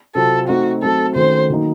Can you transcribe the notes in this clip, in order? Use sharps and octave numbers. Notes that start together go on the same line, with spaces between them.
C3 F#3 C4 F4 A4
A3 C4 D#4 F#4
F#3 A3 C4 A4
D#3 A3 C#4 F#4 A4 C5
D#3 F#3 A#3 D#4